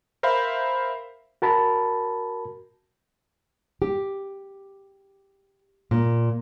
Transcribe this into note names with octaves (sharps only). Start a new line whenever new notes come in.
A#4 C5 E5 F5 B5
F#4 A#4 A5 B5
G4
A#2